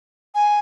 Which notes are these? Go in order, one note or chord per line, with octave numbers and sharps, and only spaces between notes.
G#5